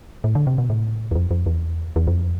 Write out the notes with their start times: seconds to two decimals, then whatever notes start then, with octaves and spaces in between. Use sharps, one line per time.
0.24 A2
0.35 D3
0.47 C3
0.58 B2
0.70 A2
1.11 E2
1.15 F2
1.31 F2
1.46 E2
1.96 E2
2.07 F2